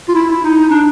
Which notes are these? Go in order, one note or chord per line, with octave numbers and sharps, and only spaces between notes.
F4
E4
E4
D#4
D#4
D4